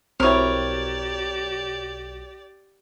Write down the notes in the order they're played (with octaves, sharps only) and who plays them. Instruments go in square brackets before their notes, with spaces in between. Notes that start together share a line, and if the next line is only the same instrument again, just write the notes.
[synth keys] B1 [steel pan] C4 E4 [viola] G4 D5 [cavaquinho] A#4 C#5